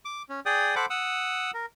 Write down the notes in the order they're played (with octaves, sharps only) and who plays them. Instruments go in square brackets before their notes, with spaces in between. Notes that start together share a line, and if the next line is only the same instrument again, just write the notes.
[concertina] D6
C#4
G#4 D5 G5 D#6
A4 C5 F#5 B5 D6
F#5 D#6 E6
A#4